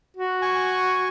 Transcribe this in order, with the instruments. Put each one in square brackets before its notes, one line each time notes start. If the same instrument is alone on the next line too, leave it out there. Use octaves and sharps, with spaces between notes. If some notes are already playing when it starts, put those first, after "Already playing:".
[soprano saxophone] F#4
[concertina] G#5 C#6